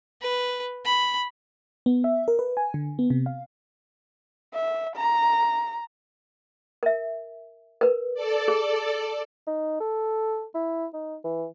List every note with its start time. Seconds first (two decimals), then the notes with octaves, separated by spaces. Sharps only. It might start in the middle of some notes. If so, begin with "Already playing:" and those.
0.22 B4
0.85 B5
1.86 B3
2.04 E5
2.28 A#4
2.39 B4
2.57 G#5
2.74 D3
2.99 B3
3.10 C3
3.26 F5
4.54 E5
4.96 A#5
6.83 A#4 E5
7.81 A#4 B4
8.14 A4 D5
8.48 G#4
9.47 D#4
9.80 A4
10.54 E4
10.94 D#4
11.24 E3